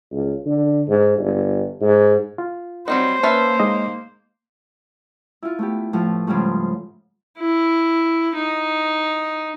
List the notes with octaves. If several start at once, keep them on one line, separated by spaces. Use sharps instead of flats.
C#2
D3
G#2
G1
G#2
F4
F#3 G3 C4 D#4 C5
A#3 C#4 B4 E5 A5
G#3 D#4 D#5
E4 F4
A3 B3 G4
A2 F3 A3
G#2 C#3 F3 G3 A3
E4
D#4